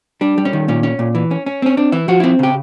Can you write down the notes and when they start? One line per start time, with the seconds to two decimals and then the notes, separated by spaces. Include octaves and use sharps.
0.21 G3 D4
0.38 G3
0.45 C#4
0.53 D#3
0.68 A#2 C#4
0.83 C#4
0.99 A#2
1.15 E3
1.31 C#4
1.46 C#4
1.62 C4 C#4
1.77 C4 D4
1.92 E3 E4
2.08 F3 F#4
2.20 C4 E4
2.39 C#3 G4